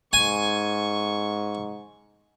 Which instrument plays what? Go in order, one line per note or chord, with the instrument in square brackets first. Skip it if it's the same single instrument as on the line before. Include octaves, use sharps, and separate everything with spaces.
[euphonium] G#2 [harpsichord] G#5 [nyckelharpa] C#6